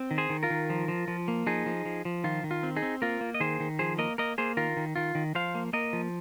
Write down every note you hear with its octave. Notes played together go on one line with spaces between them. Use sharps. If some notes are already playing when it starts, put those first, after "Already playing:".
Already playing: C4
D#3
G#4 C5
D#3
F4 A#4
D#3
F3
F3
F3
A#3
F3 D#4 G#4
F3
F3
F3
D#3 F4
D#3
F4
C4
D#4 G#4
C4
A#3 F4 A#4
A#3
D#5
D#3 G#4 C5
D#3
F3 G#4 C5
A#3 A#4 D#5
A#3 A#4 D#5
A#3 G#4 C5
D#3 F4 A#4
D#3
D#3 F4
D#3
F3 C5 F5
A#3
A#3 A#4 D#5
F3